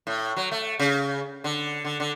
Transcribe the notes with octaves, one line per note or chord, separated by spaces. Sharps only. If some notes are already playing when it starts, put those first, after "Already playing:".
A2
F#3
A3
C#3
D3
D3
D3